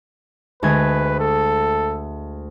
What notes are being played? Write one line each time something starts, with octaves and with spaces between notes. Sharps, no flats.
D2 G#3 B4 G#6
A4